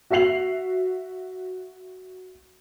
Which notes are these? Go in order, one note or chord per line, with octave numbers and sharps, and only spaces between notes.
F#4 E5 F#5 C7 F7 F#7